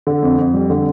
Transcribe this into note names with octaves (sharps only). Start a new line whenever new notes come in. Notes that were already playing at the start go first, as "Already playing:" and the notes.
D3
F2
F2
G3
D3